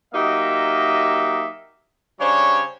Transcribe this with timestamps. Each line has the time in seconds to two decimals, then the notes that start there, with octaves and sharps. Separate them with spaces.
0.13 F#3 A#3 D#4 G4 D#5 E5
2.19 C#3 G3 D4 C5 C#5